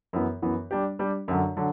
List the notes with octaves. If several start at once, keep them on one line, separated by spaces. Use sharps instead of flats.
F#2 E3 B3
F#2 E3 B3
G3 D4 G4
G3 D4 G4
F#2 D3 F#3
D3 F#3